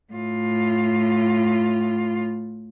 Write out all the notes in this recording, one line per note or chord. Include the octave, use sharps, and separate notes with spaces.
A2 F4